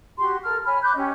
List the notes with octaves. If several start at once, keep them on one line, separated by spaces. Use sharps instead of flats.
F#4 G4 C6
A4 A#4 F6
C#5 G#5 B5 F6
B5 D6 F#6 G6
C#4 G4 D#5